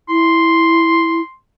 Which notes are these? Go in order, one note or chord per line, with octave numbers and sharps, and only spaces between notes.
E4 C6